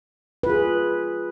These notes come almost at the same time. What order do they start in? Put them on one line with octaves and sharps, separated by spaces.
B4 F4 G#4